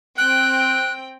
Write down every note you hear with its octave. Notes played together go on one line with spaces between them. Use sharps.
C4 G5 F#6